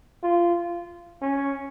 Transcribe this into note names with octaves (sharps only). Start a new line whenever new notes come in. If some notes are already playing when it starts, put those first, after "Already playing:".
F4
C#4